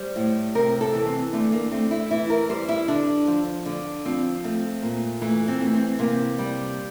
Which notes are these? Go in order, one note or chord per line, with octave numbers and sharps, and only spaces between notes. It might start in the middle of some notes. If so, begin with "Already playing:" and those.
Already playing: G3 C5
A2
C3 A#4
A4
E3
C4
D3 A3
A#3
A3 C4
E4
E3 E4
A#4
G3 C5
E4
D3 D4
F3
D3
F3 C4
A3 C4
A#2
E3 A3
C4
A3
C4
C3 A#3
G3